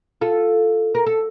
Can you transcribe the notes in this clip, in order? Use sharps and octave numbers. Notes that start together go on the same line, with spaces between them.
F4 A4
A#4
A4